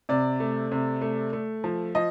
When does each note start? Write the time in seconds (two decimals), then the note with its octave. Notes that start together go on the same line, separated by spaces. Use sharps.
0.09 C3 D5
0.40 A3
0.72 C3
1.01 A3
1.33 A3
1.64 F3
1.95 F3 D#5